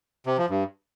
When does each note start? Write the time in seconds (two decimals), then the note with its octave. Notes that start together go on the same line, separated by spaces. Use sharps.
0.26 C3
0.38 F3
0.49 G2